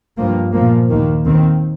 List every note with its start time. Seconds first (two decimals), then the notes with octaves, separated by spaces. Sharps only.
0.17 G2 F3 A#3
0.53 A#2 F3 A#3
0.88 D#2 D#3 A#3
1.24 D#2 D#3 C4